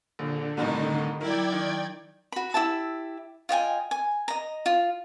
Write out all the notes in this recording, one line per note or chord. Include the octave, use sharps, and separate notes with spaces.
A#1 D3
C2 A2 D#3 D#4
F#3 E4 A#4 D5 G5 G#6
D#3
F#4 B5
E4 G4 E5 A5
F4 D#5 G5 G#5
G#5
D#5 A#5
F4